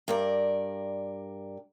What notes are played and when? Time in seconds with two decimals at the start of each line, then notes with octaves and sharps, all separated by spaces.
0.08 G2 A#4 D5